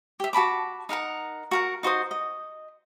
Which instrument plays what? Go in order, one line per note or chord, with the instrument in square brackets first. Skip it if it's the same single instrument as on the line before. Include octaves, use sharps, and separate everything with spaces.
[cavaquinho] G4 E5
F#4 A5 B5 D6
D#4 A#4 F#5 A#5
F#4 A#4 F#5
D#4 F#4 C5 D#6
D#5